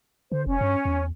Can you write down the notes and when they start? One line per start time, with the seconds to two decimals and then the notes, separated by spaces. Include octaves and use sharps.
0.32 D3 C5
0.47 F1 C#4
0.61 G2
0.85 E2